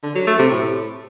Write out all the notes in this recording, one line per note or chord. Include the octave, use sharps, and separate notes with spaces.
D3
F#3
A3
C3
A2